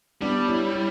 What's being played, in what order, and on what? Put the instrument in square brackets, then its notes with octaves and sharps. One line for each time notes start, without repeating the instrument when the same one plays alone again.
[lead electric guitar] G3 [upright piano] B3 D4
[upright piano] C#4 E4
C#4 E4